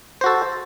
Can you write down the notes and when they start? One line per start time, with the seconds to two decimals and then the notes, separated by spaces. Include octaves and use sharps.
0.21 C5
0.24 F#4
0.26 A4